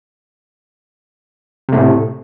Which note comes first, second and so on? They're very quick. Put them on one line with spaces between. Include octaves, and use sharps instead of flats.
C3 A3 A2